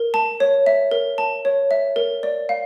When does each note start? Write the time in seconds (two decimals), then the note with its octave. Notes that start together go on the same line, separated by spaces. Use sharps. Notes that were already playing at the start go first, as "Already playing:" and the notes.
Already playing: A#4
0.14 A5
0.40 C#5
0.66 E5
0.91 A#4
1.18 A5
1.45 C#5
1.71 E5
1.96 A#4
2.23 D5
2.49 F5